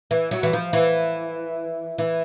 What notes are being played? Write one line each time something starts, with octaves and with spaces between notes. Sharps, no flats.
E3
F#3
E3
F3
E3
E3